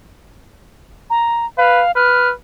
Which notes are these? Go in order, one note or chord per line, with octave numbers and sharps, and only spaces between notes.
A#5
B4 F5
B4 F6